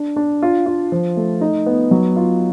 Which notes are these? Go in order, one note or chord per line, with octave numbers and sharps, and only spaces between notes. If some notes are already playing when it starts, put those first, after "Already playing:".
Already playing: D4
D4
F4
F4
F3
A3
D#4
B3
F#3
F4